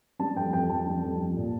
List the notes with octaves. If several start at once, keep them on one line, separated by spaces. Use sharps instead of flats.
G3 A5
F2 G5
F2 G5
F2 A5
G3
F2
F3
A#2